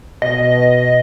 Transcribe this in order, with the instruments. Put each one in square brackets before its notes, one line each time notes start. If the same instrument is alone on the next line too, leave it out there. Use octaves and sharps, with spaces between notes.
[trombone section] B2 [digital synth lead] D#5